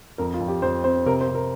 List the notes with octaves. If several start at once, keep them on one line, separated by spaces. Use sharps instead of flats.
F2 A#4
F4
F2
G4
F2 C5
C4 C5
C3 A#4
C5
C3
A#4